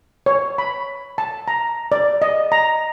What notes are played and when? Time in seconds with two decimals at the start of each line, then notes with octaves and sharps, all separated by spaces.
0.26 C#5
0.58 B5
1.18 A5
1.48 A#5
1.92 D5
2.22 D#5
2.52 A#5